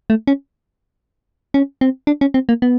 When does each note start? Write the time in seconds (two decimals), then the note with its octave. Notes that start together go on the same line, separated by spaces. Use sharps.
0.10 A3
0.27 C#4
1.54 C#4
1.81 C4
2.07 D4
2.21 C#4
2.34 C4
2.49 A#3
2.62 B3